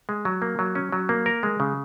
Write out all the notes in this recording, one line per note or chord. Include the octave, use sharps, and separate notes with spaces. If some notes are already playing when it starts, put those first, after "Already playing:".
G#3
F#3
A#3
F#3
C#4
F#3
A#3
A#4
G#3
C#3